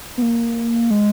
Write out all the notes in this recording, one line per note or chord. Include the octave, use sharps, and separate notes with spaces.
B3
A#3
G#3